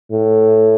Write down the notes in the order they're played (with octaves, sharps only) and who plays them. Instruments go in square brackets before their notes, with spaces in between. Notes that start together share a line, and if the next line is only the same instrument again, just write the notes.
[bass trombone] A2